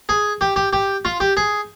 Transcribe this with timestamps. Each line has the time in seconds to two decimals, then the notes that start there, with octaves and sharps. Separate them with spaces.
0.09 G#4
0.41 G4
0.56 G4
0.73 G4
1.05 F4
1.20 G4
1.37 G#4